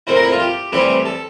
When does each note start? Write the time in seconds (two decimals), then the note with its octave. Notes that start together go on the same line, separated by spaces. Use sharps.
0.07 A#2 A3 C4 E4 C5
0.16 A#4
0.23 E4
0.32 F4
0.40 G4
0.72 A2 E3 G3 C4 E4 G4
1.05 A4